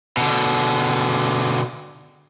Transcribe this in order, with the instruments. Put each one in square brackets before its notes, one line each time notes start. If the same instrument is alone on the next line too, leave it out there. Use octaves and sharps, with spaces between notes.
[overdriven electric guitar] B2 D3